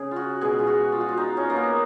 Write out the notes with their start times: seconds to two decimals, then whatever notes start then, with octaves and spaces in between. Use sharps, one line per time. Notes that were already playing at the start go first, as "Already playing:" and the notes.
Already playing: C#3 G#4
0.11 F4 F#4
0.41 B2 G#3 G#4
0.59 F4
0.67 F#4
0.92 F4
1.01 F#4
1.09 F4
1.17 D#4
1.37 C#4
1.50 A#3
1.56 B3